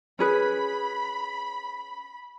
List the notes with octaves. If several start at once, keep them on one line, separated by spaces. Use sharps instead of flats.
C#4 G#4 B4 B5